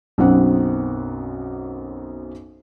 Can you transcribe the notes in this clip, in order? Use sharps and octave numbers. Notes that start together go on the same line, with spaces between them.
B1 F#2 C4 F#5